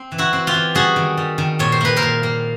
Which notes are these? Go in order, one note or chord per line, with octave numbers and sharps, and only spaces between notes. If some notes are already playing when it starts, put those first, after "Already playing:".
Already playing: C4
E3
E4 F#4
C4
F4 G4
E3
G3 F#4 G#4
D#3
G3
D#3
A#2 C#5
C5
A#3 B4
A#4 C5
A#2
A#3